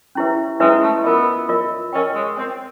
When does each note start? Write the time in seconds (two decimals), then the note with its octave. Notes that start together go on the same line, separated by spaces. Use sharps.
0.15 C#4 E4 G4 B4 E5
0.60 G#3 C#4 E4 G4 B4 E5
0.83 A3
1.04 B3 F4 A#4 D#5
1.49 F4 A#4 D#5
1.93 C#4 A#4 D#5 G5
2.15 G#3
2.37 C4 A#4 D#5 G5